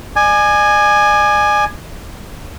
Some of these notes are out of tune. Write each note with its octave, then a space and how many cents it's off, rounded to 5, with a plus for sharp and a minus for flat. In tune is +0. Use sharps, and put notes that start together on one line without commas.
D5 +40 G#5 +0